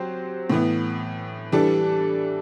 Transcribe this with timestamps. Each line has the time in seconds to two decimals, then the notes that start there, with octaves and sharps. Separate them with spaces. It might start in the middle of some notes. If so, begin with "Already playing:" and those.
Already playing: F#3 C4 G4 C5
0.50 A2 E3 B3
1.52 E3 G3 D4 A4